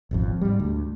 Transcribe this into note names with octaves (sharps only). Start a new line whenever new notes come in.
D#1 G#1 F2
G#2 G3
D2